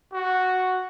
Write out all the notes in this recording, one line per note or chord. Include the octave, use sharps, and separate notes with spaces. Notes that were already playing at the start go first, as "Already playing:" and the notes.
F#4